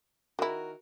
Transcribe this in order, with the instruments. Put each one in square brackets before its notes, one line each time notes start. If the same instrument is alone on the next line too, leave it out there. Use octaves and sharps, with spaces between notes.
[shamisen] D#3 E4 [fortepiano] F#4 A#4